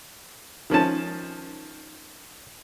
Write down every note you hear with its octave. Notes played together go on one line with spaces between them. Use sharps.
D#3 F3 C#4 A5